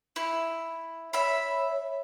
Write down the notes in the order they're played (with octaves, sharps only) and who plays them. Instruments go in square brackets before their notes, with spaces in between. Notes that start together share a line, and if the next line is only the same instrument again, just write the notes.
[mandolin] E4
[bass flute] C#5 [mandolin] E5 B5